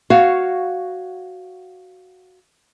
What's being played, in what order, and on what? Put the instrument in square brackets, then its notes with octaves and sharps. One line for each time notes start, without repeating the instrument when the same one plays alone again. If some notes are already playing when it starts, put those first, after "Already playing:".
[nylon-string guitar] F#4 C#5 F5